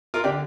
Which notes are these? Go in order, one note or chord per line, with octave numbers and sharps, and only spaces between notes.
F4 A#4
D3 D4 G4